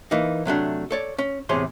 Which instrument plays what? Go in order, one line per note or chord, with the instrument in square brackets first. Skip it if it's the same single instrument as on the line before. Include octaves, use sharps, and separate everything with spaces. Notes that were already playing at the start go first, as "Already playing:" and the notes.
[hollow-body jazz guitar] E3 A#3 D#4
C3 F#3 A3 D4
A4 C#5 D5
C#4
E2 A2 C3 G#4 C#5 C6